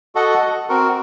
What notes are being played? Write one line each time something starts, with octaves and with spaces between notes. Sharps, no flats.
F#4 A4 D#5 F#5
C4 F#4 A#4